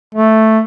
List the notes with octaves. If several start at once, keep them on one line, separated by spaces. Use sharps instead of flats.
A3